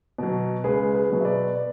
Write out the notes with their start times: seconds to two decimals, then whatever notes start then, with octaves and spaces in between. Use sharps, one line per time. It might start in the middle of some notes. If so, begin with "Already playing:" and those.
0.18 B2 F#3
0.64 C#2 G#4 B4
0.94 G#4 B4
1.10 B2 F#3
1.20 E5
1.25 B4 D5
1.55 B4 D5